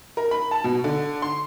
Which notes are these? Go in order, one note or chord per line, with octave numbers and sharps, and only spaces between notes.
A#4
B5
A5
B2
D3
C6